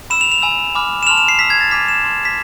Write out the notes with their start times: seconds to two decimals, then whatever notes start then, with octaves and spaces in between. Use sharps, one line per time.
0.10 B5 E6 E7
0.21 F7
0.32 F7
0.42 G#5 B5 E6
0.75 G#5 B5 D6 F6
1.03 E7
1.07 A5 C6 F6 F7
1.17 E7
1.28 C7
1.39 B5 E6 B6
1.50 G#6
1.60 A6
1.71 G#5 D6 F6 B6
1.88 E7
2.04 A5 C6 F6
2.25 B6